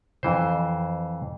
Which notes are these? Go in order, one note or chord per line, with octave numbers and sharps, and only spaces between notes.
F2 E3 C5